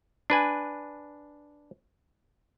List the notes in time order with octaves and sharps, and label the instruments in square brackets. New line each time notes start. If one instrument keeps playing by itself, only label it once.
[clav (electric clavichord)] D4 B4 G#5